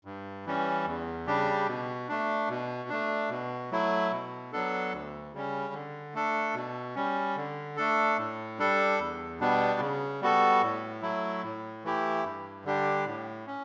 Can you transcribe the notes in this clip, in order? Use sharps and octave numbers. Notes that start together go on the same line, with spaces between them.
G2
E3 G3 C#4
E2
C#3 G3 D4 G4
B2
A3 D4
B2
A3 D4
B2
F#3 A3 E4
B2
F#3 B3 D4 A4
D2
C#3 G3 C#4
D3
A3 D4 A4
B2
G3 C#4
D3
A3 D4 A4
A2
G3 D4 A4
E2
B2 G3 B3 D4
C#3
G3 B3 F#4 A4
A2
F#3 A3 E4
A2
E3 A3 E4 G4
G2
D3 G3 D4 G4
A2
C#4